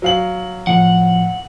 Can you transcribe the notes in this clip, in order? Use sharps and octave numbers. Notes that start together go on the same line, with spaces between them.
F#3 F5 F#7
A2 F3 F#5